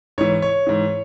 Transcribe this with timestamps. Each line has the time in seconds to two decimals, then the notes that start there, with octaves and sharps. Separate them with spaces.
0.18 G#2 E3 C#5
0.42 C#5
0.67 G#2 E3